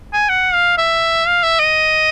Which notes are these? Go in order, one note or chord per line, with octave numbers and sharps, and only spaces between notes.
G#5
F#5
F5
E5
F5
E5
D#5